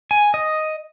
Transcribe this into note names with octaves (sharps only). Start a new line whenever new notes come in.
G#5
D#5